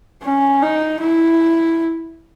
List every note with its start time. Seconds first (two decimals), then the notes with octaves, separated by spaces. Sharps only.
0.23 C#4
0.62 D#4
1.01 E4